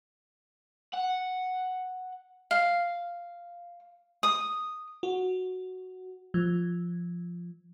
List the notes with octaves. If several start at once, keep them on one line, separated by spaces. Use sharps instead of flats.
F#5
F5
D#6
F#4
F3